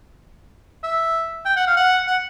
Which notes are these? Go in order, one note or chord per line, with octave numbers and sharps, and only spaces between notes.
E5
G5
F#5
F5
F#5
F#5